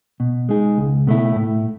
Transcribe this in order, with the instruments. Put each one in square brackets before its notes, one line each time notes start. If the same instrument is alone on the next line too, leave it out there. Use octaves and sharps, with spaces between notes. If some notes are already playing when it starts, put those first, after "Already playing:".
[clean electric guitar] B2
G#3 D#4 G#4
C#2
B2 A3 E4
A2